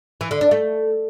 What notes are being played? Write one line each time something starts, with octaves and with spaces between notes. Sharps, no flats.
E3
D3
D4
A3